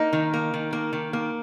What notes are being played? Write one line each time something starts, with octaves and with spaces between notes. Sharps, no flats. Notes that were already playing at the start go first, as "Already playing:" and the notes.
Already playing: A#3 D#4
D#3
A#3
D#3
A#3
D#3
A#3